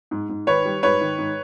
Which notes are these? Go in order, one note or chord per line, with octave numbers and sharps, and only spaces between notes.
G#2
G#2
D#3 B4 C#5
G3
G#2 B4 C#5
D#3
G#2